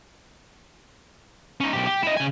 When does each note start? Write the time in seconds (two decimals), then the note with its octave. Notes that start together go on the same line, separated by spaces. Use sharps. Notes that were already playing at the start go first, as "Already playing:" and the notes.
1.61 C#4 D#4
1.73 B1 G4
1.87 G4
2.03 E4 D#5
2.17 C#3 G#5